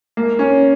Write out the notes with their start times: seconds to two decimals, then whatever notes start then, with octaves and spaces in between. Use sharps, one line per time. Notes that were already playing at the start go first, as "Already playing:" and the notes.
0.17 A#3
0.39 C#4